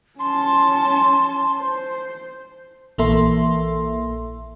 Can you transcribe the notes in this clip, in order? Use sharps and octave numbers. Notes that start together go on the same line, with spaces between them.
C#4 A5 C6
C5
A#1 E3 A#3 A4 E5 C6